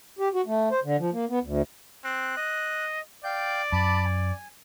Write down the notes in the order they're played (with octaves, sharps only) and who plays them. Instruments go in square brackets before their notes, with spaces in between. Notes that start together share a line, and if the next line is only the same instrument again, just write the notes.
[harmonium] G4
F#4
A3
C5
D3
F3
A#3
B3
D2
[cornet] C4 [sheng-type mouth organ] F#6
[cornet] D#5
[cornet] D5 [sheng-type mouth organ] F5 G5 G6
[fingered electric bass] F#2 [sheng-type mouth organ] A5 B5 D6
[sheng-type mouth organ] G#5